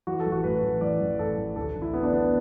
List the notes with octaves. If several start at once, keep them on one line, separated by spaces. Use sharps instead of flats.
E3 F#4
A4
A1
F#4
A2 B4
A1
E3 D5
A1
A2 A4
A1
D2 A4
D2
E4
D3 B3
D4
D3 B3